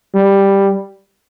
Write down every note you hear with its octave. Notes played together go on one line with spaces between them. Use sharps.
G3